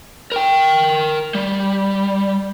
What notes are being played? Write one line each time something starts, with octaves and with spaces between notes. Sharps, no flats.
A#4 G5
G3